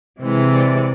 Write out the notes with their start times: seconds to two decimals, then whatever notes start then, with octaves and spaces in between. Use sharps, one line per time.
0.21 C3 E3 G#3
0.49 D5